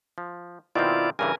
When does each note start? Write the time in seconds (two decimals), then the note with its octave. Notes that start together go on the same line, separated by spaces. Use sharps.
0.18 F3
0.75 B2 D#3 C4 E4 F4 D5
1.19 G2 C#3 E3 A#4 G#5